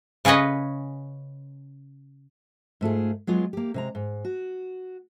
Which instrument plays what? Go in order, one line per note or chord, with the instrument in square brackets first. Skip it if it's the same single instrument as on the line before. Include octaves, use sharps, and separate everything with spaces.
[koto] C#3 C#4 G#4 B4 D#5
[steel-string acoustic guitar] G#2 A3 F4 G#4
F#3 G#3 B3 F4
A#3 G4
C3 G#3 A#5
G#2
F#4